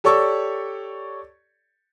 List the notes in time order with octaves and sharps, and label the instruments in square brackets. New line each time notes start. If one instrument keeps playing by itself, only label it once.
[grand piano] G4 A4 C#5 D5 C#6 E6